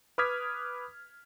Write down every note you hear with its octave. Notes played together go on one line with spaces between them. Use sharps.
B4 D6 D#6 F6 G#6 B6